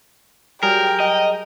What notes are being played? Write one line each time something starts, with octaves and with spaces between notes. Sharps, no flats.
F#3 G3 G#4 A#4 G5
D#5